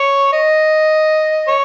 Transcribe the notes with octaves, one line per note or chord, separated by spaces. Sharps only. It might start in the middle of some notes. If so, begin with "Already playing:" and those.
Already playing: C#5
D#5
C#5